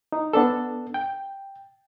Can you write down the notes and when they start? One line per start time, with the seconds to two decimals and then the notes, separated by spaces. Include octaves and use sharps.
0.12 D#4
0.33 B3 D4 A4
0.94 G5